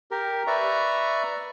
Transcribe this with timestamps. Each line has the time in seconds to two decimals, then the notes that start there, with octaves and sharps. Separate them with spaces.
0.11 G4 A#4
0.47 B4 D5 E5 A#5 C#6